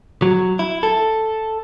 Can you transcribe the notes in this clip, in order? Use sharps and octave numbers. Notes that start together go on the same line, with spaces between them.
F#3
E4
A4